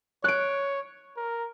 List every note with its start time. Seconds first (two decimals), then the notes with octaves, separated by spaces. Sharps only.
0.24 C#5 F#6 D7
1.17 A#4